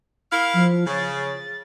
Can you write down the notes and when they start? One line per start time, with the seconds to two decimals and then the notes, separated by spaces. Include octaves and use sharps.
0.32 E4 A#4 F5
0.54 F3
0.87 C#3 A6